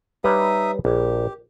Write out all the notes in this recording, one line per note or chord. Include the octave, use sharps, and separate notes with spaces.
G3 D#4 B4 C#5 E5 D#6
A#1 G4